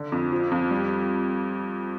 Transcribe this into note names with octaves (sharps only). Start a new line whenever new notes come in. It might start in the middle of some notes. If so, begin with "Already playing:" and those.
Already playing: D3
F2
F3
F2
G3